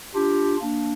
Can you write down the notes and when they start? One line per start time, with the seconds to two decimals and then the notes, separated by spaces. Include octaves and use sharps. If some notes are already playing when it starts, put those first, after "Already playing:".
0.15 D4 F4 G4
0.62 A#3 D4